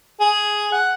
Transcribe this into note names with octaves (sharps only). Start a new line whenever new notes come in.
G#4
F#5